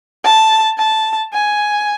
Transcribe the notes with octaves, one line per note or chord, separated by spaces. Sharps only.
A5
A5
G#5